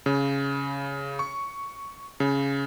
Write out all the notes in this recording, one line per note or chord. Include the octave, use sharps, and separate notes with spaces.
C#3
C#6
C#3